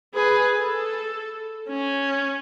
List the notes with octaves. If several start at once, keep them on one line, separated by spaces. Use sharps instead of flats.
G#4 B4
A4
C#4